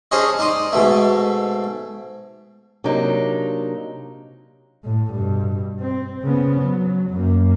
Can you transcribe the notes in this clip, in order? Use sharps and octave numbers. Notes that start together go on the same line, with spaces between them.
C#4 D4 G#4 C5 C#5 D#5
D#4 D5 C6 D#6
G#2 B2 A3
C3 F#3 A#3 D4 D#4
A2
G2 B2
C4
C#3 B3
F#3
F#2 A#3